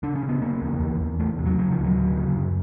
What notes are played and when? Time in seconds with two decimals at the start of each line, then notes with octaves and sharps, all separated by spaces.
0.03 C#3 D4
0.15 C#4
0.23 C#3
0.29 B3
0.41 C#3 A#3
0.62 E2
0.80 E2
1.00 E2
1.20 E2 A3
1.38 C3
1.46 F#3
1.58 C#3 F#3
1.71 F3
1.78 D2
1.85 F#3
1.97 D2
2.16 C#3
2.36 F#2